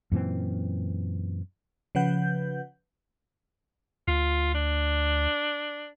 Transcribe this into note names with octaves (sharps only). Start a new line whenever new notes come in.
F#2 A#2 E3 C4
C#3 F3 B4 F#5 G6
D2 F4
D4